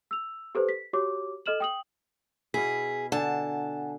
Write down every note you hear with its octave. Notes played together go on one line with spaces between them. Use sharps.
E6 F7
G4 A4 B4 C5
B6
F#4 G4 C#5 D6
A4 D#5 F6 E7 F#7
G5 D#6 F#7
B2 E4 G#4 B6
D3 F#5 G#5 A5